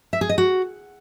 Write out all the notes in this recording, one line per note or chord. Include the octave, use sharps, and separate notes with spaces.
E5
G#4
D#5
F#4